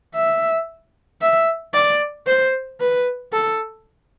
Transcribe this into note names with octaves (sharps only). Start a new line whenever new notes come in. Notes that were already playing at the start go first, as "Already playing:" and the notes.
E5
E5
D5
C5
B4
A4